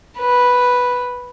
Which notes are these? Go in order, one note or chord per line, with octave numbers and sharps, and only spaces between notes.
B4